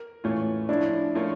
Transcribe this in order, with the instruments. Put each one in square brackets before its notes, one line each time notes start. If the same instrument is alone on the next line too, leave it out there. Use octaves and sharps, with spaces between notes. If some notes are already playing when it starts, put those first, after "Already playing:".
Already playing: [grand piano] A#4
A2 E3 A3 C#4 F4
[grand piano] F3 C#4 E4 [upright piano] D4
[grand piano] F3 A3 C#4 F4 A#4